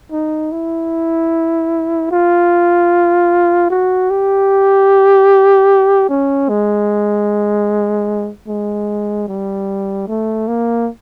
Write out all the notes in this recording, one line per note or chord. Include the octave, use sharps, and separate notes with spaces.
D#4
E4
F4
F#4
G4
C#4
G#3
G#3
G3
A3
A#3